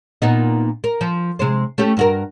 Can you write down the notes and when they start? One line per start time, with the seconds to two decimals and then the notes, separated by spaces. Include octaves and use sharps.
0.22 A#2 B3 D#4
0.84 A#4
1.01 F3
1.39 C3 G#3 C5
1.78 A3 C#4 G4
1.97 G2 F#4 A#4